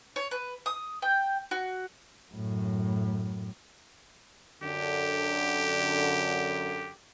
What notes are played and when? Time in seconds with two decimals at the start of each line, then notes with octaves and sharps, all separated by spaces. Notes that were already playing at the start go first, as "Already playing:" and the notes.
0.16 C#5
0.31 B4
0.66 D#6
1.02 G5
1.51 F#4
2.33 F#2 A2
4.62 F#2 D3 G4